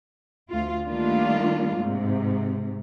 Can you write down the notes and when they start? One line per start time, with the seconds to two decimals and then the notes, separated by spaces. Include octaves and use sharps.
0.50 D2 F4
0.85 D#3 G3 A3 A#3 D4 F4
1.77 G#2 C3